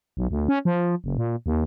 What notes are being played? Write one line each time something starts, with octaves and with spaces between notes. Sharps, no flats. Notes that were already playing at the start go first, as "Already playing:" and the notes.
B1
D2
C#4
F3
F#1
A#2
D#2